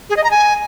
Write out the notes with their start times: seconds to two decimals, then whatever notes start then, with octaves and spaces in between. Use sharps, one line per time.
0.10 G#4
0.17 D#5
0.24 A#5
0.31 G#5